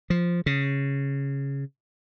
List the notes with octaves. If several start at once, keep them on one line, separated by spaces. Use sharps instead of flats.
F3
C#3